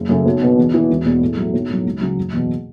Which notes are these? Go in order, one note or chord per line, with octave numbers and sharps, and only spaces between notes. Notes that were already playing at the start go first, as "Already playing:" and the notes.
Already playing: F#1
F#2 C#3 A3 C#4
B1
B2 B3
E2
E3 B3
E1
E2 B2
A2
F#3 A3
B1
A2 F#3
C#2
C#3 F#3 C#4
F#1
E2 B2